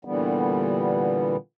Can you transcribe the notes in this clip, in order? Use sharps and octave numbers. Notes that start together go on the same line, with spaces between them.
A#2 D3 E3 G3 B3